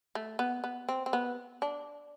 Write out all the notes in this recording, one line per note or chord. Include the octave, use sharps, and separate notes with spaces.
A3
B3
B3
C4
C4
B3
D4